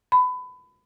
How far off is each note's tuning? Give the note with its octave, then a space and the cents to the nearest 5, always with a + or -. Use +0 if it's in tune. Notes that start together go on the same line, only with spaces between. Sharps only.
B5 +25